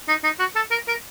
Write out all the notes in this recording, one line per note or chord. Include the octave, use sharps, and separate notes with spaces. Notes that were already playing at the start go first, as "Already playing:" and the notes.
D#4
D#4
F#4
A4
A#4
A#4